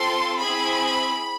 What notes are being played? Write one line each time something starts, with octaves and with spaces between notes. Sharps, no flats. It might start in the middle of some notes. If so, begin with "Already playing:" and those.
Already playing: C4 F4 A4 C6
C4 E4 G#4 B5